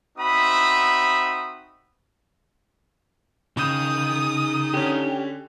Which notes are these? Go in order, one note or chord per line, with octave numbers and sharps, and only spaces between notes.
C4 D#4 F#4 E5 B5 D#6
C#3 D#4 G5 D#6
D3 C#4 G4